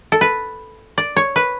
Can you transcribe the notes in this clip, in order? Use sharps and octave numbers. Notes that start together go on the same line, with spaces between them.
A4
B4
D5
C#5
B4